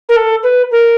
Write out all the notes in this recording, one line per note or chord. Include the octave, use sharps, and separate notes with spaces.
A#4
A4
B4
A#4